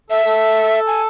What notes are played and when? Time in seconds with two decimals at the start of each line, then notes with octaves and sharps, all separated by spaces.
0.10 A4 E5
0.25 A4
0.87 G#5